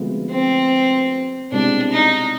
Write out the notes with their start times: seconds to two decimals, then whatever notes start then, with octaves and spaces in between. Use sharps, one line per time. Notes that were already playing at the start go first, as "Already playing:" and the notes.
Already playing: D2 C3 F3 G#3 B3
0.31 C4
1.52 C2 B2 G#3 C4 D4 G4
1.92 D#4